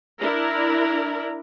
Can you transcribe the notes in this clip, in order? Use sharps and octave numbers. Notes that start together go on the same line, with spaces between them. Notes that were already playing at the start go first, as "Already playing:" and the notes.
D4 E4 A#4